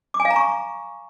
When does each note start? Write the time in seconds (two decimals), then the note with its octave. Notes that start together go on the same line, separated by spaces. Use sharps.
0.14 D6
0.20 G#5
0.25 F5
0.31 A#5
0.36 C#6